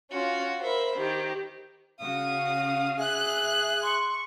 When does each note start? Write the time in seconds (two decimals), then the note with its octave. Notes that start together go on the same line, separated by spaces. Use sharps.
0.11 C#4 F4 F#4
0.62 A#4 C5 E5 B5
0.97 D#3 G4
2.00 C#3 F#4 F5 D#6
2.98 G#4 E5 F#6
3.82 C6 C#6